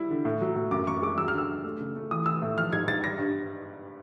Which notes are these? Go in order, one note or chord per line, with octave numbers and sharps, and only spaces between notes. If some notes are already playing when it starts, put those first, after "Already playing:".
Already playing: G3 E4
D3
A2
F#3
A2
F#2 D6
F#2 C#6
G#3 D6
F#3 E6
F6
D3 E6
D3
A3
C#3
A3
E3 D#6
E3 E6
A2
F3 F6
G#2 G#6
G#2 A6
G3 A#6
G2